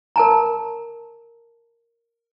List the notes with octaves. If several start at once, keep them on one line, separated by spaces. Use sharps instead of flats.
A#4 A5 A#5